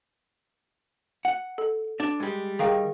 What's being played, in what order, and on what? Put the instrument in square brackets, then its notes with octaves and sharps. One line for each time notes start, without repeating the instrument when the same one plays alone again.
[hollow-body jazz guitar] F#5
[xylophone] A4
[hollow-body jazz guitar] D4 D5
G3 G#3
[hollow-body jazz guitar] D#3 G3 A#4 [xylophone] G#4 F5 G5